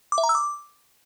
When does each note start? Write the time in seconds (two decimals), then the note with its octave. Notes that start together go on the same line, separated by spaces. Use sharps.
0.12 D6
0.18 E5
0.23 A#5
0.29 E6
0.35 D6